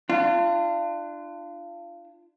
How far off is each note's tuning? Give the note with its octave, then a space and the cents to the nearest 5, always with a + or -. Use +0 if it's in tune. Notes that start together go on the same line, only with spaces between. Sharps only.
D4 +25 F4 -25